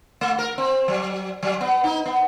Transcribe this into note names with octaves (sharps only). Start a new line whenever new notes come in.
A3
A#4
C4
F#3
F#3
B3
D#4
B3